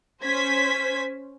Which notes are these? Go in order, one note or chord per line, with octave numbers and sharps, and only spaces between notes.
C#4 C5 G#6 B6